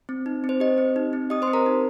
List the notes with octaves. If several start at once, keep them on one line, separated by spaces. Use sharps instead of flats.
C4
D#4
C4
C5
G4 D#5
C4
D#4
C4
G4 D#5 D#6
C5 C6
C4
A#4 A#5
D#4